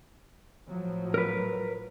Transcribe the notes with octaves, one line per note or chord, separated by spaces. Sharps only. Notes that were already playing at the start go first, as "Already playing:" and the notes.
A2 F3 F#3
A#4 B4